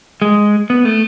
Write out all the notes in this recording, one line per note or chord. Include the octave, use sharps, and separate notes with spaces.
G#3
B3
A3